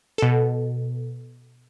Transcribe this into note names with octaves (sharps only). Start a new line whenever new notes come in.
B2 A4